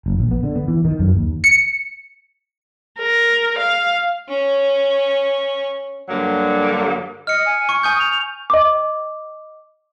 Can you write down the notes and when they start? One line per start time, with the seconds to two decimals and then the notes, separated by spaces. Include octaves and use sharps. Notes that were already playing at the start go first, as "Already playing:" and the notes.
0.06 F#1
0.18 A#1
0.31 B3
0.43 D3
0.56 B3
0.68 E3
0.85 D#3
0.99 F#2
1.16 D#2
1.44 C#7
2.99 A#4
3.58 F5
4.28 C#4 C#5
6.09 G2 D3 F#3 A#3
7.27 D#5 F6 C#7
7.46 G#5
7.69 C#6
7.83 G#5 C#6 D#6 G6
8.00 F7
8.50 D#5 D6